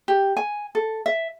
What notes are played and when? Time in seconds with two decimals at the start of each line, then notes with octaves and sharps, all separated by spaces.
0.08 G4
0.37 G#5
0.75 A4
1.06 E5